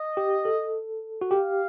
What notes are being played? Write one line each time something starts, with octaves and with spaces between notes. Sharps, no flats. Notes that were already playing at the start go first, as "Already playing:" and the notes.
Already playing: D#5
G4
A4
F#4
G4 F5